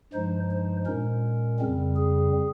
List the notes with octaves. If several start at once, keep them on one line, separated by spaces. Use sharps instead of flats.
G2 F3 G#3 D#4 C5
C5
A#2 G#3 C#4 A#4
F2 C#3 G3 C4
G#4